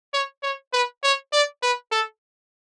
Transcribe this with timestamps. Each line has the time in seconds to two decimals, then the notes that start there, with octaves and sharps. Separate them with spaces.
0.13 C#5
0.43 C#5
0.73 B4
1.03 C#5
1.33 D5
1.62 B4
1.92 A4